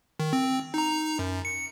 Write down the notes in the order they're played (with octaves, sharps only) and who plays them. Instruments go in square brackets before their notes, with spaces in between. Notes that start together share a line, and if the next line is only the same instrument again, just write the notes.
[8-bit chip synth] D#3
C4
D#4 A#5
F#2
C#7